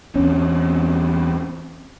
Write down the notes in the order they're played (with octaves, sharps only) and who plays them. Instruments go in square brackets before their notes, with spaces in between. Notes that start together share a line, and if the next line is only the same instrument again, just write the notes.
[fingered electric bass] E2 C4 C#4